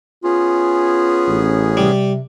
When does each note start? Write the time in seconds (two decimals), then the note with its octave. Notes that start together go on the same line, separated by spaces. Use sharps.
0.24 B3 C#4 F4 G#4
1.27 A1
1.77 C3 G3